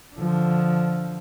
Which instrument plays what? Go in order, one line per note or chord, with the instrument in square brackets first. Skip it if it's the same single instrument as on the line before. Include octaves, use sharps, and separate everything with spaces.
[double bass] D3 F3